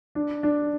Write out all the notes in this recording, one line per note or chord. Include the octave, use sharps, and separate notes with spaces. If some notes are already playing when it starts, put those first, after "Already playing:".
D4
D4